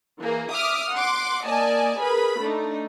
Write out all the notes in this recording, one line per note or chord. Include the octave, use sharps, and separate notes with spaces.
E3 A#3 G#4
E5 D6 D#6 F6
F#5 C6 D6
A#3 D5 D#5 G#5 A5
G#4 A#4 B4 B5
A3 D4 D#4